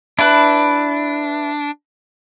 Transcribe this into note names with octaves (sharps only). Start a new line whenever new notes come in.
D4 E4 B4